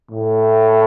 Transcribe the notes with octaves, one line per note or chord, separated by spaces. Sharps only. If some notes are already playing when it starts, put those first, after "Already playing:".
A2